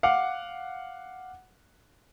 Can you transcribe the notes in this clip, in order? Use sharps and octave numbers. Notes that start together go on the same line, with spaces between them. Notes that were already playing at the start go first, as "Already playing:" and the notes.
F5 F#5 D6